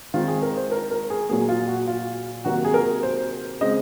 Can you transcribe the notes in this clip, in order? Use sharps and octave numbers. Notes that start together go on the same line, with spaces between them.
D#3 G#3 C4 F4
G#4
A#4
C5
A#4
A#4
G#4
A#2 F#3 A#3 G#4
F4
F#4
F4
C3 D#3 F#3 A#3 F#4
G#4
A#4
C5
C#3 G#3 C4 D#5